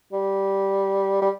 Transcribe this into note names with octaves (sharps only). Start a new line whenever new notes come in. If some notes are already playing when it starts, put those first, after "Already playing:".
G3
G3